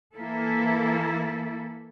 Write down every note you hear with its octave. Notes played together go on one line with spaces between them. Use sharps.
E3 A#3 E4 A4